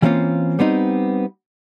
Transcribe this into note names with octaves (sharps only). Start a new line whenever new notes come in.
E3 G3 A#3 C4 C#4 F4
G3 B3 C4 D#4